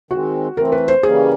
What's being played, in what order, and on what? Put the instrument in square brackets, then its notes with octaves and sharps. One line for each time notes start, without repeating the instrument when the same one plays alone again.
[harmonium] D#3 G#3 C4 [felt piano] F#4
[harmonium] E3 A3 C4 [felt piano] A#4
[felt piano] B4
C5
[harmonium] C#3 E3 G3 A#3 C#4 [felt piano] G#4